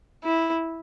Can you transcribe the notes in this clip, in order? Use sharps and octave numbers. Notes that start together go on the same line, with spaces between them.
E4